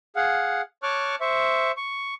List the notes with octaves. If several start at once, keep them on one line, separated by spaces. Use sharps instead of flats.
G#4 F5 F#5
C#5 A5 C#6 D6 F6 F#6
C5 E5 C#6
C#6